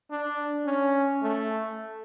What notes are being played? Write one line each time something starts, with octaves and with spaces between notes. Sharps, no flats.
D4
C#4
A3